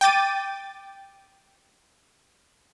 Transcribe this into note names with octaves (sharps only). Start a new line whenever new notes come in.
G5 D6 A6 D#7